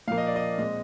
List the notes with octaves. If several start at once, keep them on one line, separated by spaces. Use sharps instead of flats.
A#2 F3 A#3 F5
D#5
D5
D#5
A#2 G#3 C4 D#5